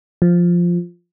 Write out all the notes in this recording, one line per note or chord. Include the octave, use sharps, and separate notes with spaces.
F3